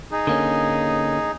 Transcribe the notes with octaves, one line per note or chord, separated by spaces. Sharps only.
D#4 G#4
D3 A#3 C#4